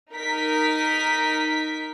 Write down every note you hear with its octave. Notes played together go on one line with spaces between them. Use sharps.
D#4 A#4 B6